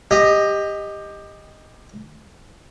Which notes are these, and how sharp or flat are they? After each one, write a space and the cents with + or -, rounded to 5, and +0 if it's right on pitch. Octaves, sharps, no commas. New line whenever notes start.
G4 +20 D#5 +0